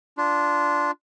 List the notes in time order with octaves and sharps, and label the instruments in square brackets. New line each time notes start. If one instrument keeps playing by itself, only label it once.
[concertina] D4 F4